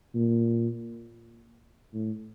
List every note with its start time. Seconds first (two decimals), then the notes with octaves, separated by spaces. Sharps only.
0.15 A#2
1.93 A2